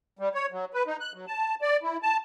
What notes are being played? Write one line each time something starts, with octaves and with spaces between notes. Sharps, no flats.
G3
C#5
F#3
B4
D#4
F#6
F#3
A5
D5
E4
A5